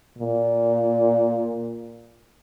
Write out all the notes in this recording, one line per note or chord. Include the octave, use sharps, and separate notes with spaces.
A#2